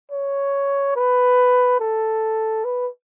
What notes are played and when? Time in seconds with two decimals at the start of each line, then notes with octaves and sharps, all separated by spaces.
0.12 C#5
0.96 B4
1.80 A4
2.65 B4